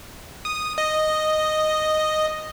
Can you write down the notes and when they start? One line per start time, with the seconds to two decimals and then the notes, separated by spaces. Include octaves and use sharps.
0.45 D#6
0.78 D#5